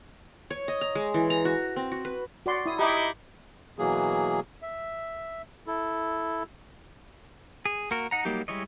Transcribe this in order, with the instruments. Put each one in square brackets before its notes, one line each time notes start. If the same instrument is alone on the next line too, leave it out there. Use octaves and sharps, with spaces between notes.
[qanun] C#5
D#5
A#5
G#3
E3
A#5
F#4
C4
F#4
B4
[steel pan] F#4 D5 C6
E4 D#6
[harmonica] D#4 E4 D#5 [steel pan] G4
[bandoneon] B2 E3 F#3 A#3 G#4
E5
E4 A4
[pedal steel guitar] G#4
A#3 F#4 A#4
D#4 F#5 A#5
F#3 G3 A#3 D#4 G4
G3 G#3 E4 C#5 D#5